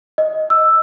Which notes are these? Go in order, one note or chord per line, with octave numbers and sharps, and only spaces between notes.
D#5
E6